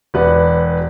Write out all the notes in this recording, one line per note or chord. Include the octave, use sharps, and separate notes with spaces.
E1 B4 D5 F#5